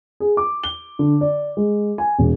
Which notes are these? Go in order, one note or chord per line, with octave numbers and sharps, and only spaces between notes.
G#4
D6
G7
D3
D5
G#3
G#5
E1